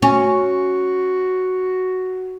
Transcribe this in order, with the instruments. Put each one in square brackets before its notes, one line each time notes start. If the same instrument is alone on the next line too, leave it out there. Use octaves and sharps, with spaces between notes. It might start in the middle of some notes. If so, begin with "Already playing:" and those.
[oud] C#4 [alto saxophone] F#4